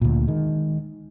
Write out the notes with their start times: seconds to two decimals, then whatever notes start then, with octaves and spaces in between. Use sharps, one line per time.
0.02 D2 A#2
0.27 D#3 G#3